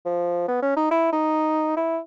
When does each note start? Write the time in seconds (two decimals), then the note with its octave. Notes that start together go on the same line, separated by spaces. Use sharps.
0.05 F3
0.48 B3
0.62 C#4
0.76 D#4
0.91 E4
1.12 D#4
1.76 E4